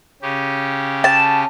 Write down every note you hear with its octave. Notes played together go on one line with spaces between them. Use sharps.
C#3 C#4 G4
A5